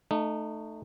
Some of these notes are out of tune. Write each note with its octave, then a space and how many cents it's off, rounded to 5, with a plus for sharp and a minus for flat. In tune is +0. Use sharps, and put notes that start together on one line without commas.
A3 +0 D#4 -25